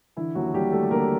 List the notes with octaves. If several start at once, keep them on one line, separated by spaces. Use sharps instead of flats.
D3 E3 E4
D#2 F#3 F#4
D#2 G3 G4
G3 A3 A4
D3 A#3 A#4